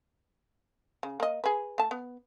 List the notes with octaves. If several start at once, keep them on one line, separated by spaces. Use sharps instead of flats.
C#3
A#3 D#5
G#4 B4
A3 A5
B3